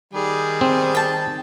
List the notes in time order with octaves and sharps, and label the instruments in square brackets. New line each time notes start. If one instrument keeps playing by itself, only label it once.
[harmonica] D#3 G3 [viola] G#4
[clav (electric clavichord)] C4
[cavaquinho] G5 A5